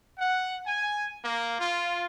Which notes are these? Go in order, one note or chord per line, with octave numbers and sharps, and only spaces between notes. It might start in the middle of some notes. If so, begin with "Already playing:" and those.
F#5
G#5
A#3
F4